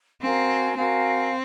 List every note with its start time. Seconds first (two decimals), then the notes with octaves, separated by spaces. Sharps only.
0.21 C4 F#4 A#4 F5 G#5
0.77 C4 F#4 A#4 F5 G#5